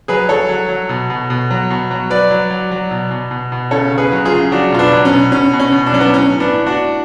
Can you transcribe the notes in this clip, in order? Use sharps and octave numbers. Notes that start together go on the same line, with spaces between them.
F#3 G#4 B4
F#3 A4 C#5
F#3
F#3
B2
B2
B2
F#3
B2
F#3
F#3 B4 D5
F#3
F#3
F#3
B2
B2
B2
B2
C#3 A4 C#5
C#3
G#4 B4
F#3
F4 G#4
C#3
F#3 D4 F#4
B2 F4
B3 D4
F#3
C#4
B2
B2 C#4
B2
C#4
B2
D4
F#3 C#4
B3 D4
A2 C#4
A2
B3 D4
A2
D4 F#4
A2